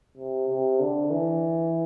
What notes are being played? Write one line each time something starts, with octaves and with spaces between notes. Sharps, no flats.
C3
C3
D3
E3